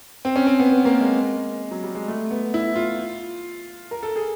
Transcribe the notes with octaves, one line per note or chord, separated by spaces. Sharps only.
C4
C#4
C4
B3
B3
A#3
G#3
F#3
G3
G#3
A3
B3
E4
F4
A#4
A4
G#4